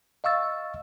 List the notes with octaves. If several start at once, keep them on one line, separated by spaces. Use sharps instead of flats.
D#5 F5 C#6 E6 A6